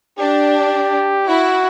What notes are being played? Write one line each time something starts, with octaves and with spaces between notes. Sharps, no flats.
D4 G4
E4 F#4